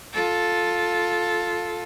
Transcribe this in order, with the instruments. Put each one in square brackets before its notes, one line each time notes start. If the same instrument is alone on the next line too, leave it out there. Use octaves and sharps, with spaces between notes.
[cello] F4 A4